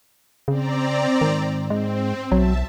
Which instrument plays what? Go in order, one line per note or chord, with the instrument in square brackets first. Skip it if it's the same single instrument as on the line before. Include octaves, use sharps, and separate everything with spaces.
[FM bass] C#3 [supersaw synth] C4 D5 A#5
[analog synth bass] G#2 [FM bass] D#3
[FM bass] G#3 [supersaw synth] C4
[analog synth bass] B1 [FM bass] F#3 [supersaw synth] E5 A5